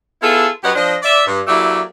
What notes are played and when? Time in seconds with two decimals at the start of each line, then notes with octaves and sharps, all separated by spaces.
0.22 B3 E4 F4 G#4 A4
0.64 F#2 G4 B4 C#5 D#5 F#5
0.75 F3 D4 C5 D#5
1.03 D5 E5
1.27 G2
1.47 F#3 A3 A#3 E4 G4 D5